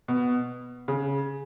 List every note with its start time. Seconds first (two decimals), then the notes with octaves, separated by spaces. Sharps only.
0.08 B2
0.88 C#3